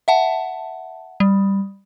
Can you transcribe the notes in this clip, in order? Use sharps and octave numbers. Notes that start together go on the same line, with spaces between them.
E5 F#5 A5
G3